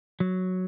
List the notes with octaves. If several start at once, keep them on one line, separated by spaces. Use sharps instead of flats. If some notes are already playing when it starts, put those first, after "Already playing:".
F#3